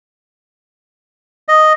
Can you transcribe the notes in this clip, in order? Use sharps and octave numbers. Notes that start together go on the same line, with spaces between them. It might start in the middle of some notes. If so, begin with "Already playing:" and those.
D#5